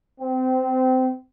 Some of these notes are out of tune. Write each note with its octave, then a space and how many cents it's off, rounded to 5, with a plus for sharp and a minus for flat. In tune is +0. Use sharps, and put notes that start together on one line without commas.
C4 -25